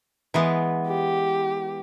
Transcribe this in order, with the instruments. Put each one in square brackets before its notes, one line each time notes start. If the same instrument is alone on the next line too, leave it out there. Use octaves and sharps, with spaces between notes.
[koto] E3 G#3 B3
[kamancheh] G4